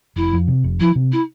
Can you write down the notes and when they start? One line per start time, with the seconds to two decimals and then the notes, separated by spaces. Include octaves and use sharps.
0.16 F1 E4
0.33 F2
0.48 C3
0.64 F1
0.80 F3 E4
0.96 C3
1.12 E4